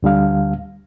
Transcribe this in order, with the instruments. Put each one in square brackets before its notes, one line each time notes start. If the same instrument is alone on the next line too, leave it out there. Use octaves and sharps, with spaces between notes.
[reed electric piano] D2 D3 G3 F5